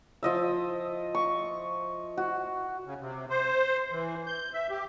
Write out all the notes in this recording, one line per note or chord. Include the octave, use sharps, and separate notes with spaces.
F3 D#5 E5
C#6
F#4
C#3
C3
C5
E3
G6
E5
G4